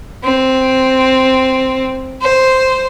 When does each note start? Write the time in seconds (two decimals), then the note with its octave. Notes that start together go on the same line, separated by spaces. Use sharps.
0.24 C4
2.22 C5